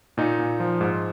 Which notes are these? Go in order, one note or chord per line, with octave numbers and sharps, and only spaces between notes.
A#2 D#4
A#2
F3
G#2